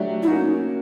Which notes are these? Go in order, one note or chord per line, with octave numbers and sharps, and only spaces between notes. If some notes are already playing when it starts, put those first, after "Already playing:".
Already playing: F#3 A3 D4 G4
E4
A#3 C#4 D#4 F#4